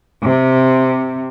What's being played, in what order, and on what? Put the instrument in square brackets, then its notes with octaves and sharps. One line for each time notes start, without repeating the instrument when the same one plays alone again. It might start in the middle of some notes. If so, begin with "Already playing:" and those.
[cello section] C3